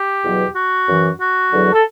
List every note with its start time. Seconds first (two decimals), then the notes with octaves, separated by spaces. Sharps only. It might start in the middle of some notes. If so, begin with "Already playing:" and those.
Already playing: G4
0.23 E2 B2 F#3
0.55 F#4
0.88 F#2 E3
1.19 F#4
1.52 E2 D3 F#3
1.72 A4